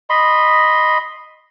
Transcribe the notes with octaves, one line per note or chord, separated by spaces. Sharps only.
D#5 B5 C6